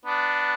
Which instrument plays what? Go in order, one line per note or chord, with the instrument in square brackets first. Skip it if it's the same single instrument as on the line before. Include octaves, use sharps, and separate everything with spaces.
[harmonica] B3 D4